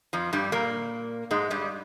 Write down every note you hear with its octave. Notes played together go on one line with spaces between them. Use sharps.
F2 F3
G2 G3
A#2 A#3
G#2 G#3
G2 G3